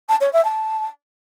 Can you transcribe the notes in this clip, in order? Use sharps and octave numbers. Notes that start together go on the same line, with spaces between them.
A5
C#5
E5
A5